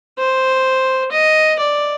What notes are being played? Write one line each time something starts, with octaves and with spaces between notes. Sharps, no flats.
C5
D#5
D5